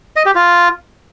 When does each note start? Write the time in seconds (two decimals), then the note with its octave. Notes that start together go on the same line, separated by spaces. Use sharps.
0.16 D#5
0.26 G4
0.35 F4